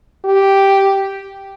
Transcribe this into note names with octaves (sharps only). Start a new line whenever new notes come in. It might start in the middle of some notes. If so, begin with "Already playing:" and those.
G4